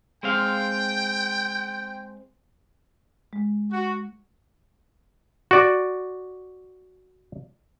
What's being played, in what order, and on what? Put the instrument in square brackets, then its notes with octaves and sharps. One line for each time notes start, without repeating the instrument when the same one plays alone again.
[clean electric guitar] G#3 C4 F5 [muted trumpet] G5
[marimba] G#3
[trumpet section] F#4
[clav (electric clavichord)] F#4 D5